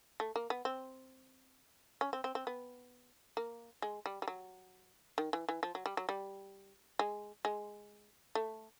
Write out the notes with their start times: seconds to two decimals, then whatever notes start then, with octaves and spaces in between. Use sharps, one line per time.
0.20 A3
0.36 A#3
0.50 B3
0.65 C4
2.01 C#4
2.13 C4
2.24 C4
2.35 C4
2.47 B3
3.37 A#3
3.82 G#3
4.06 G3
4.22 G3
4.28 F#3
5.18 D#3
5.33 E3
5.49 E3
5.63 F3
5.75 F#3
5.86 G3
5.97 F#3
6.09 G3
6.99 G#3
7.45 G#3
8.35 A3